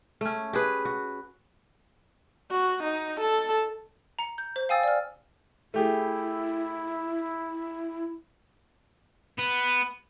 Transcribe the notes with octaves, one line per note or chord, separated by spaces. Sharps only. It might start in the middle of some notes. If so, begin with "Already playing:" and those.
A3 C#4
G4 G#4 B4
F#4
F#4
D#4
A4
A#5 C#7
G6
C5
F5 G5 G#5 D#6 E6 A6
D5 F6
A3 E4 G4 G#4
B3